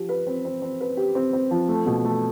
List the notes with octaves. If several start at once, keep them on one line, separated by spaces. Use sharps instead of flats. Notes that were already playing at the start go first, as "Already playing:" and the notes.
Already playing: F3 G4
B4
C4
C4
C4
B4
G4
C4
C4
F3
A3
B2
A3